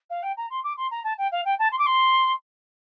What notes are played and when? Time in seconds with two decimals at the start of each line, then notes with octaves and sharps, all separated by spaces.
0.10 F5
0.22 G5
0.37 A#5
0.50 C6
0.63 D6
0.77 C6
0.91 A#5
1.04 A5
1.18 G5
1.31 F5
1.45 G5
1.58 A5
1.71 C6
1.78 D6
1.86 C6